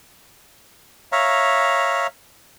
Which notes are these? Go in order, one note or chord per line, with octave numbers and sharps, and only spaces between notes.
C#5 E5 F5 A#5